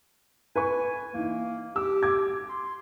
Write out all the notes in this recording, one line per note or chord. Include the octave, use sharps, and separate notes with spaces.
B4 G#5 B5 C#6
E3 A#3 D#4
G4 E6
D6 G#6
C6